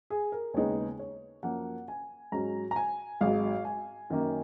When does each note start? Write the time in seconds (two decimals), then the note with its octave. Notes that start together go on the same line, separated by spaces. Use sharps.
0.10 G#4
0.32 A#4
0.54 D#2 C#3 G#3 B3 D#4 C#5
0.99 C#5
1.43 F#2 F3 A#3 C#4 F#5
1.88 G#5
2.32 G#2 F#3 C#4 A#5
2.71 A#5
2.76 G#5
3.21 G#1 G#2 F#3 F5
3.65 G#5
4.10 F#2 D#3 A#3 C#4